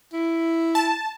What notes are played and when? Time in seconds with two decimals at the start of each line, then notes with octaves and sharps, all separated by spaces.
0.13 E4
0.75 A5